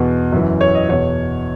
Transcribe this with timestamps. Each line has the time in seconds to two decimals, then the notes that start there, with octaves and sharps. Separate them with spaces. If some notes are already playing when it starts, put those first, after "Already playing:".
Already playing: E2 B2
0.32 F#2 E3
0.61 C#5
0.75 D#5
0.89 E2 B2 C#5